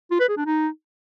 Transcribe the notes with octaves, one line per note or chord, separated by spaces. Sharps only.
F4
B4
G#4
D4
D#4